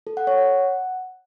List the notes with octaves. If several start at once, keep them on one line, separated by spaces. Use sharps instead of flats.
A4
F#5
C#5
F#5